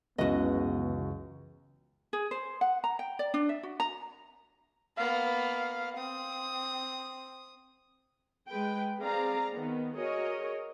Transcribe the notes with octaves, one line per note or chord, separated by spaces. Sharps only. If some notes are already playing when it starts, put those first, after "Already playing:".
C#2 F#2 C#3 E3 B3 F#4 B4 D#5
G#4
C5
F#5
A#5
G5
D5
D4
E5
F#4
A#5
A#3 B3 F5
C4 D#6
G#3 B4 G5
C4 G#4 D5 F5 A#5
D#3 B3
F#4 G#4 A#4 C#5 D#5